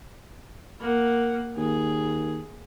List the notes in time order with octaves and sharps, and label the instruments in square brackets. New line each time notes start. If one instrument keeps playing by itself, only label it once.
[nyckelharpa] A#3 F#5
[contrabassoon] D#2 [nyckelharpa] G#4